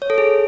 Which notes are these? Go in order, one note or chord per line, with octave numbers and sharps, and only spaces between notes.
C#5
A4
G#4